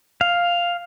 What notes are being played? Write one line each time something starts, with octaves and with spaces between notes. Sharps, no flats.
F5